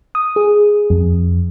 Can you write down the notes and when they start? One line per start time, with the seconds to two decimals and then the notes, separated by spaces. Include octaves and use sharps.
0.15 D#6
0.36 G#4
0.90 F2